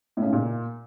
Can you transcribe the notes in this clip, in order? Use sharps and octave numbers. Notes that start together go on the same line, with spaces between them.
A2
C#3
G#2
A#2